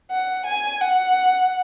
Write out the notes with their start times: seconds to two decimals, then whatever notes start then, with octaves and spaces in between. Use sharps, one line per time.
0.11 F#5
0.46 G#5
0.81 F#5